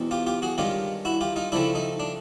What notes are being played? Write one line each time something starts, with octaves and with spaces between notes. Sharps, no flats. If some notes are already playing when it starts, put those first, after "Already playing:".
Already playing: E2 B2 G#3 C4
F4 G4
F4 G4
F#4 G#4
G2 D#3 G#3 C#4 F4 G4
E4 F#4
F4 G4
D#4 F4
C#3 F3 A3 C4 D4 E4
D#4
D4